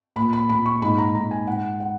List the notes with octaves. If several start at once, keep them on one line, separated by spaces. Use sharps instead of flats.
A#2 B5
B5
A#2 B5
C#6
G#2 B5
A#5
G#2 A#5
G#5
G#2 F#5
F#5